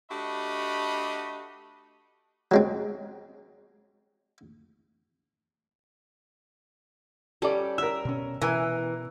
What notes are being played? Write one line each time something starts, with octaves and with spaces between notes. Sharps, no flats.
A3 D4 F#4 G4 D#5 B5
F#3 G#3 C4
G3 C#4 G4 A4 D5
A#4 E5 E6
B2 C#4
B2 E3 A#4 G#5